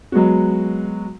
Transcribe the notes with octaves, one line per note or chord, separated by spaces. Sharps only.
F#3 G#3 B3 F#4